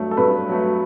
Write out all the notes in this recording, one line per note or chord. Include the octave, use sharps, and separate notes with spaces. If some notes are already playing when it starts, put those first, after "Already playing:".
Already playing: G2 F#3 A3
A4
G2 B4
F#3 A3